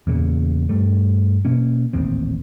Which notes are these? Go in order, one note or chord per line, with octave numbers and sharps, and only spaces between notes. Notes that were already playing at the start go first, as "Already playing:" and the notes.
E2 A#2 C#3
G2 G3 A3
B2 A#3 C#4
D#1 A1 D#2 C4